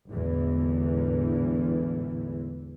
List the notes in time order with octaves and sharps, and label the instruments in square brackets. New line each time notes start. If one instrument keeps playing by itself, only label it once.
[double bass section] G#1 E2 A2 D3 E3